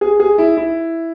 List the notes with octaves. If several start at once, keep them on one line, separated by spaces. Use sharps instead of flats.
G#4
G#4
E4
E4